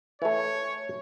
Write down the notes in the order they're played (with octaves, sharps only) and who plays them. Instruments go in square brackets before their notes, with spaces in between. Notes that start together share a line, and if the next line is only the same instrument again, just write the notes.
[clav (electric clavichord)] E3 A3 [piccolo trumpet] C#5